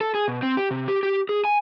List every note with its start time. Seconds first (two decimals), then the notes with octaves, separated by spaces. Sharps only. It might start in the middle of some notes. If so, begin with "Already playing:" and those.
0.01 A4
0.14 G#4
0.28 B2
0.43 C4
0.57 G4
0.71 C3
0.88 G4
1.03 G4
1.29 G#4
1.45 G#5